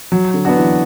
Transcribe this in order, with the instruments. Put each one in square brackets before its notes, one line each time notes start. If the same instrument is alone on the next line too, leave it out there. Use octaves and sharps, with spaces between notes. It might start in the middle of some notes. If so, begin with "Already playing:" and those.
[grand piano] F#3
[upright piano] D3
[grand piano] B3 D4 F#4
[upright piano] E3